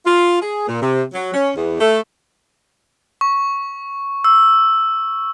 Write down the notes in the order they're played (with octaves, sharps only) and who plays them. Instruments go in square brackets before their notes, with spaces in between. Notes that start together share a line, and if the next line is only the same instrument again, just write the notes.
[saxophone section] F4
G#4
A#2
C3
F#3
C#4
E2
A3
[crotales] C#6
E6